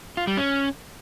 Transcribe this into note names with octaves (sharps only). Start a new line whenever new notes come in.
F4
G3
C#4